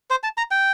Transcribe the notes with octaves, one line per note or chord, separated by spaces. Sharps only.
C5
A5
A#5
G5